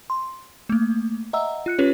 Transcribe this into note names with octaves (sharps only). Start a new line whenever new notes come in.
C6
A3 A#3
D#5 E5 F#5 A#5 E6
F4 F#6 C#7
C#4 F4 G4 B4 C#5